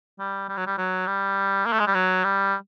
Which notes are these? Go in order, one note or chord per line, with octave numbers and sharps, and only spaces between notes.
G3
G3
F#3
G3
F#3
G3
A#3
A3
G#3
G3
F#3
G3